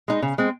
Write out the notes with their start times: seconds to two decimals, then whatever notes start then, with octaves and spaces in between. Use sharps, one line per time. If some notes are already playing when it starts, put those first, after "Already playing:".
0.08 G#3 D#4
0.22 C#3
0.38 G#3 C4